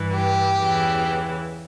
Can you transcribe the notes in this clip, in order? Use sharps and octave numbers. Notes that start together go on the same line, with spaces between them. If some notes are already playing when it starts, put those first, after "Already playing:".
Already playing: G2 E3
G4
E2 C#3 E3